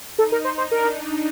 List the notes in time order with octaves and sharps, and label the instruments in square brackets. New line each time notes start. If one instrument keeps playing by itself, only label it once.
[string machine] D#4 [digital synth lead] A4
[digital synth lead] A#4
C5
C5
[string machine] D4 [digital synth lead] A#4